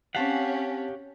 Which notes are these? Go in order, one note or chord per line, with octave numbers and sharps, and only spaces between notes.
C4 C#4 G4 F5 F#5 A5 B6